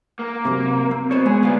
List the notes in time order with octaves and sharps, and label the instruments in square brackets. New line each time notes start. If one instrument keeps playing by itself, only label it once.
[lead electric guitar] A#3
[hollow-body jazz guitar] F#2 C3
C4
[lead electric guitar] B2 [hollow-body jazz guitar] C5 C#5
[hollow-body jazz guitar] G#3 B3 [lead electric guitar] G#4
[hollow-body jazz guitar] D2 F5 [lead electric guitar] B3 D4